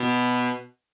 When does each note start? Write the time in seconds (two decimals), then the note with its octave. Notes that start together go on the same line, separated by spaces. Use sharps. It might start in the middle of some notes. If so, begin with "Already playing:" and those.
Already playing: B2